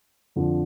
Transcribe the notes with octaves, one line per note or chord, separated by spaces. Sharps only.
F2 D3 F3 D4 F4